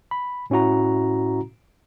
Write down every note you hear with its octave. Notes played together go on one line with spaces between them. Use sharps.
B5
A2 C#4 E4 F#4 A#5